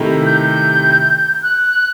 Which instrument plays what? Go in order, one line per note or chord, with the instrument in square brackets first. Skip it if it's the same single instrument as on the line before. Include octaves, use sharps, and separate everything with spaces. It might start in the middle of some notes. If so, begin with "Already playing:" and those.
Already playing: [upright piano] C3 D#3 A3 E4 G4
[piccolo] G6
F#6